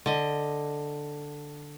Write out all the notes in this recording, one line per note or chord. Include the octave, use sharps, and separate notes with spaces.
D3 D#5